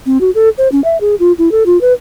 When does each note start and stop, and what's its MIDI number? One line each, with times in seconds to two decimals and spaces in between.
0.06 0.18 60
0.21 0.30 66
0.35 0.49 69
0.58 0.68 72
0.72 0.83 61
0.84 1.00 76
1.01 1.15 68
1.20 1.32 65
1.38 1.51 64
1.52 1.63 69
1.66 1.80 65
1.81 1.93 71